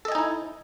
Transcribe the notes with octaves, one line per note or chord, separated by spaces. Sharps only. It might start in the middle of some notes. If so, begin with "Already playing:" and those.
D#4 E4 A4 D#5 G#5